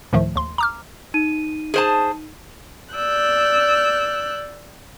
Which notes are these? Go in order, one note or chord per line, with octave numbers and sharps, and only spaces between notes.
D2 A2 D#3 F3 A3
D#2 C6
A#5 D6 F6
D#4 D#7
G#4 C5 A5
D5 E6 F#6 G6